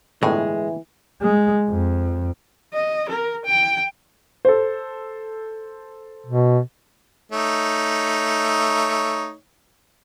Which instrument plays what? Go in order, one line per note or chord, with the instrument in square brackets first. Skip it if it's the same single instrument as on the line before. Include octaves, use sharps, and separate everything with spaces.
[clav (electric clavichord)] G1 A2 [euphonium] E3 [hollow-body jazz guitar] G#3
[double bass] G#3
F2
[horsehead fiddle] D#5
A#4
G5
[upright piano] A4 C5
[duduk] B2
[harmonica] A3 D#4 C#5